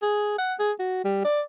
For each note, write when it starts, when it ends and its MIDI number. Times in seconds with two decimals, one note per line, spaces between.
0.02 0.38 68
0.38 0.54 78
0.59 0.72 68
0.79 1.01 66
1.05 1.22 55
1.25 1.41 74